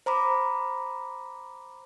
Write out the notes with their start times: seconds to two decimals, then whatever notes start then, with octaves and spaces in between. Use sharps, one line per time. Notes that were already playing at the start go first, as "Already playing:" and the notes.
0.06 C5 A#5 B5 D6